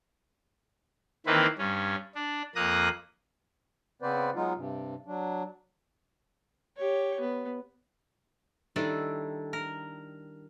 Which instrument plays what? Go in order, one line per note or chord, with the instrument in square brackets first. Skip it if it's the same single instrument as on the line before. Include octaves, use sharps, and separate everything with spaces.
[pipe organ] D#3 E3 A#3 C4 B4
G2 C#4
D4
F2 A#3 A#5 D#6 F#6
[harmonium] C#3 B3 C4 B4 C5 D5
F#3 G#3 B3 D#4 F4
G2 C3
F#3 D4
[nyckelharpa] G4 C#5
B3
[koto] D#3 G3 D4 E4 A4
A#4